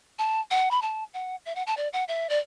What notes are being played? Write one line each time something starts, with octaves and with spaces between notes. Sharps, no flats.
A5
F#5
B5
A5
F#5
E5
F#5
A5
D5
F#5
E5
D5